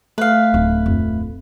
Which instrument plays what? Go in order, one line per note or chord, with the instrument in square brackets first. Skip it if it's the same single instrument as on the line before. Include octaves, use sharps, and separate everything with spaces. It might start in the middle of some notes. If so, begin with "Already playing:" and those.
[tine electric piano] A3 [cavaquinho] B4 F5
[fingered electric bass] D1 [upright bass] D#4
[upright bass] F2